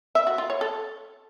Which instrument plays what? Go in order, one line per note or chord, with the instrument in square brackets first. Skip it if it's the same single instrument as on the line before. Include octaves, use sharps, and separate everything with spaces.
[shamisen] E5
F#4
F4
C#5
A4